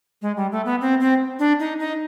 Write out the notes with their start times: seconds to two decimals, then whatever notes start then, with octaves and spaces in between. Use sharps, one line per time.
0.22 G#3
0.37 G3
0.52 A3
0.65 B3
0.81 C4
1.00 C4
1.39 D4
1.60 D#4
1.79 D#4